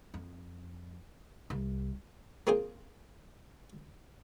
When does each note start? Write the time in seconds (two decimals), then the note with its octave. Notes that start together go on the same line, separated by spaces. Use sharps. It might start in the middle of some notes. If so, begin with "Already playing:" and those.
0.14 F2
1.50 C2
2.47 A#3 C4 F4 G#4 C5